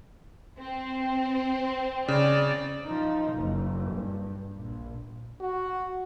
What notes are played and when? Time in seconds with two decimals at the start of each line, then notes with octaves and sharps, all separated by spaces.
0.59 C4
2.08 C#3 D5
2.85 F3 D#4
3.34 F#1
3.93 G2
4.57 A#1
5.40 F#4